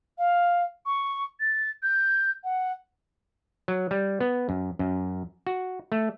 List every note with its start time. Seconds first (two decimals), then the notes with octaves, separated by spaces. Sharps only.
0.18 F5
0.86 C#6
1.40 A6
1.83 G6
2.44 F#5
3.68 F#3
3.91 G3
4.20 B3
4.49 F#2
4.79 F#2
5.47 F#4
5.92 A3